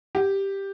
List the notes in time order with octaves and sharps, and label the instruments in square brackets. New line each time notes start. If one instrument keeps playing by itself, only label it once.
[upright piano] G4